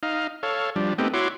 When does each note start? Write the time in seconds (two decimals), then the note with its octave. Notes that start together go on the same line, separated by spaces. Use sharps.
0.03 D#4 F5
0.43 A4 C#5 F5
0.76 F3 G3 D4
0.98 A3 B3 C4 D#4 G4
1.14 E4 F#4 C#5 C6 D6